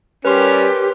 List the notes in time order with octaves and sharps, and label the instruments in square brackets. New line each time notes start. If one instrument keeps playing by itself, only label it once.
[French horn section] G3 A#4 [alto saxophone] C#4 [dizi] G4 [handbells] B4 C6